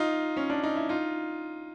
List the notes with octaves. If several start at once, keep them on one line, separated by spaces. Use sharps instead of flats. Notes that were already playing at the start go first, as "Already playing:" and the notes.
Already playing: D#4 F4
C#4
D4
D#4
E4
D#4 F4